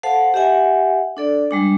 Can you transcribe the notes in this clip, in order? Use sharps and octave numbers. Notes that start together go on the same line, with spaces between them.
A4 C5 F5 F#5 A5
G4 D#5 E5 F#5 G#5
D4 A4 D5
G3 G#3 D4